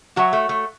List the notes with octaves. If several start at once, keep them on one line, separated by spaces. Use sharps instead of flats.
F#3 F#4 C#5 E5
A3
A3